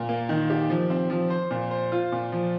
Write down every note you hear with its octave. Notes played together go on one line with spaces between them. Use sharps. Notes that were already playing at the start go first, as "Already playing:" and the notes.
Already playing: A#2
A#3
D#3
G4
F3
C4
F3
C5
A#2
C5
F4
A#2
F3